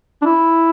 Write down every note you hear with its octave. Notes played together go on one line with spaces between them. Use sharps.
D4
E4